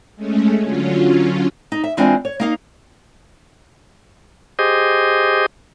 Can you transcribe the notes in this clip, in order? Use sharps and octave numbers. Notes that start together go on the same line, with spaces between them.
G#3 A3 C#4
D3 F#3 C#4 F4
D#4
E5
E3 G#3 C4 D4 F4 G#5
C#5
A#3 D#4 F5
G4 G#4 C5 D#5